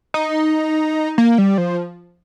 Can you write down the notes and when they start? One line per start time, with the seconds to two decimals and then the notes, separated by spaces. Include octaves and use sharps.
0.14 D#4
1.18 A#3
1.38 G3
1.58 F3